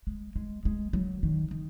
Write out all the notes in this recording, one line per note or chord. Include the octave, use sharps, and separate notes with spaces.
G#3
G#3
G#3
F#3
D#3
D#3